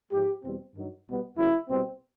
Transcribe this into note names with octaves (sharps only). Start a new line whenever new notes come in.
G#2 F3 G#3 G4
E2 B2 G3 C4
G2 D#3 F#3
C2 B2 G3 B3
E2 C#3 F#3 A#3 E4
C2 B2 G3 C4